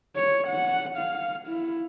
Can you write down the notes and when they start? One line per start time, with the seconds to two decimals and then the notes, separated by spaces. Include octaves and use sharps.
0.16 C#5
0.47 F#5
0.97 F5
1.48 E4